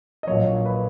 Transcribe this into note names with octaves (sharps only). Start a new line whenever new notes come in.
D#5
A#1 A#2 F#3 C#5
B4